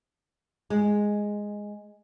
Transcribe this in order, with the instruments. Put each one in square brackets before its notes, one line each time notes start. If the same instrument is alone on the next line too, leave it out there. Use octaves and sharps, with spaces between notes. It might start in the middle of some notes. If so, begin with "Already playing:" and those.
[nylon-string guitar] G#3